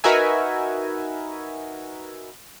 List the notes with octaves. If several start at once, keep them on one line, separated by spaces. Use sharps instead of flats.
D#4 F#4 A#4 B4 E5 G#5